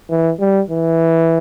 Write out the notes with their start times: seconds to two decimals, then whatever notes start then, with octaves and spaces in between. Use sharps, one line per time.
0.10 E3
0.40 G3
0.70 E3